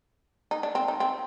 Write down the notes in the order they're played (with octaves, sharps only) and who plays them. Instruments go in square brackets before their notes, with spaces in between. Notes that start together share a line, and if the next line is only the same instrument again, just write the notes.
[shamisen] D#4
D4
C4
D#4
C4